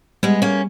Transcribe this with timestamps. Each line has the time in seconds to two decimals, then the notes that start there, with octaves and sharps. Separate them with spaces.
0.23 G3 G#3 B3
0.42 A#3 C#4